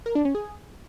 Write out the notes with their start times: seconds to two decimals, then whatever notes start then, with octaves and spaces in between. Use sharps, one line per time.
0.06 A#4
0.15 D4
0.25 C#4
0.35 G#4